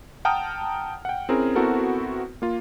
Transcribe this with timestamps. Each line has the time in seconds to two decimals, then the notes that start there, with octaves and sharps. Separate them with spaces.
0.25 F#5 G5 A5 A#5 D#6 F6
1.05 F#5 G5
1.29 C4 C#4 E4 G#4 A#4
1.55 B3 C4 E4 F#4 A4 A#4
2.42 A#3 F4